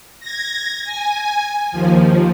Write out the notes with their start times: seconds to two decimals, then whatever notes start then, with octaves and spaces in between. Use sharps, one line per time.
0.20 G#6 A#6
0.84 G#5
1.72 D#2 F3